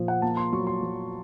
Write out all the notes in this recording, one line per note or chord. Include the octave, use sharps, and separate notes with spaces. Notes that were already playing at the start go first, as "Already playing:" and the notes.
Already playing: A#2 F3
F#5
A#3 A5
C6
F#3 C#6
C6
F#3